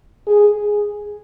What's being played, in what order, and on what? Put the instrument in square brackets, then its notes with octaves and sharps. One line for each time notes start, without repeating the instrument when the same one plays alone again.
[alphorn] G#4